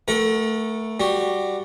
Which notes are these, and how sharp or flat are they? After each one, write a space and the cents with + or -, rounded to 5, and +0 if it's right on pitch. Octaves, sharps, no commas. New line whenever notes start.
A3 +5 A#4 +35 F#5 +0
G3 +5 F#4 +0